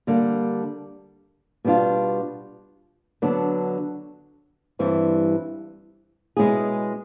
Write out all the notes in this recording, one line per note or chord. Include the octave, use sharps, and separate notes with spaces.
D3 G3 A#3 D4
B2 G3 B3 D4 F4
D3 F#3 B3 D4
G2 E3 G3 C4
B2 G#3 C#4 E4 G#4